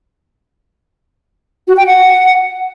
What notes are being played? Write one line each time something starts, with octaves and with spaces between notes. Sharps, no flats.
F#4
G5
F#5